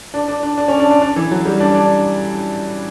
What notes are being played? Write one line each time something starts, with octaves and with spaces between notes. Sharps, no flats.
D4
D4
D4
D4
C#4
D4
D4
D4
E3
F#3
G3
D4
D4